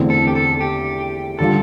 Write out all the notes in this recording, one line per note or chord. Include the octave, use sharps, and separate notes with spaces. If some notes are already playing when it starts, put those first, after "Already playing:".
Already playing: E2 D3 A3 C4 E4
A4
G4
A4
G4
D3 G3 D4 F4 A4